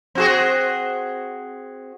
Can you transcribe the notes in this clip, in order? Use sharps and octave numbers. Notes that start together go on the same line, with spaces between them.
C4 F#4 G#4